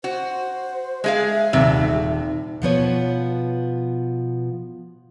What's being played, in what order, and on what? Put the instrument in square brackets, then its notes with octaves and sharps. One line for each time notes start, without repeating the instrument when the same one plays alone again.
[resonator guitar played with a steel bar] F#4 [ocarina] C5
[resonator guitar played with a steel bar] G#3 G#4 F5 [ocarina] E5
[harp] D#1 A5 [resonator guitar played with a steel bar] C3
[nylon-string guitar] B2 F3 B3 C#5